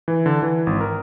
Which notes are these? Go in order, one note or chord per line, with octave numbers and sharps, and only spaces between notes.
E3
D3
E3
G#1
A#4